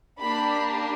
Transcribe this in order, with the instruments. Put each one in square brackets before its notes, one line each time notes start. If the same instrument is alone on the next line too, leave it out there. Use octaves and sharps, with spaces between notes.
[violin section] A#3 D4 G4 B5